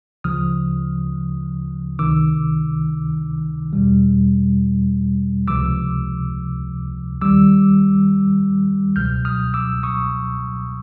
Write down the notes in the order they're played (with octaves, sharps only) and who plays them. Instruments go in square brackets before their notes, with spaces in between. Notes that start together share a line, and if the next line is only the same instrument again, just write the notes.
[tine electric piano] D2 C#3 F3 D#6 F6
C#2 C3 D#3 D6 E6
E2 B2 G3
C#2 C3 F3 D6 E6
D#2 D#3 G3 D6 E6
C#2 B2 F#3 F6 G6
D#6 F6
D6 E6
C#6 D#6